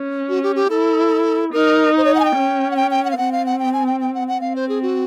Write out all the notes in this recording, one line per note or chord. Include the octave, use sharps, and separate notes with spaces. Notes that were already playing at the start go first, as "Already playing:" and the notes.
Already playing: C#4
F#4
G4
G4
E4 A4
D#4 A#4
C5
C#5
F#5
G#5
G5
C#4
F#5
G5
G5
F#5
F5
C4 F#5
F5
F#5
G5
G#5
G5
G5
F#5
F#5
C4 F5
C5
G#4
F#4